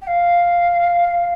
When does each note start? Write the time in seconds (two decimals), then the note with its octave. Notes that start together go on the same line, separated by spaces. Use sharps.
0.01 G5
0.07 F5